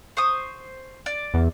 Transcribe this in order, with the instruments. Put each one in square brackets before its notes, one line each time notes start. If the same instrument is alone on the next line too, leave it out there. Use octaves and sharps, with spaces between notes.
[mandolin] C5 C#6 D#6
D5
[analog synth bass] E2